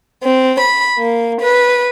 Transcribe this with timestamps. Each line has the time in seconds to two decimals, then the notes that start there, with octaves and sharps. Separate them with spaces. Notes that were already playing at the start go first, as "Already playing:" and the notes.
0.22 C4
0.60 B5
0.97 A#3
1.41 B4